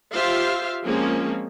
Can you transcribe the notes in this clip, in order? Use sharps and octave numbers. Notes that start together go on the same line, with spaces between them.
F4 G4 C5 E5 F5
F3 G#3 A#3 C4 C#4